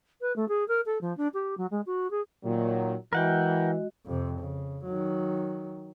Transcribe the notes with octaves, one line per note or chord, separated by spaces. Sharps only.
B4
A3
G#4
A#4
A4
F3
D4
G4
F#3
G#3
F#4
G#4
A#2 D#3 F#3
E3 G#3 F#4 A#4 D#5 F#5 G5
F2 C3
C#3
D#3 F#3